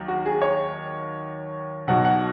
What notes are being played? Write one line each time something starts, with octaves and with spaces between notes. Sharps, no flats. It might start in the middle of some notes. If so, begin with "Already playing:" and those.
Already playing: D#2 D#3 F#3
F#4
G#4
C#5
B1 B2 F#3 F#5
F#5